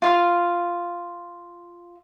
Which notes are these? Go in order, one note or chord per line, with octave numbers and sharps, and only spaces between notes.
F4 F5